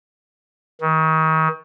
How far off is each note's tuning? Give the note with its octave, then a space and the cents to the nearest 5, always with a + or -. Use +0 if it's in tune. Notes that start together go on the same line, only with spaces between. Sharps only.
D#3 +35